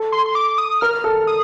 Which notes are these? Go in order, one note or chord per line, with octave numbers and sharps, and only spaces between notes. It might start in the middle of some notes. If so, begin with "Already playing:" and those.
Already playing: A4
C6
C6
D6
D#6
A#4 F6
A4
D#6